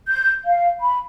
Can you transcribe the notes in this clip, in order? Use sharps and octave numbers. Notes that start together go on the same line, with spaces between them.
G6
F5
B5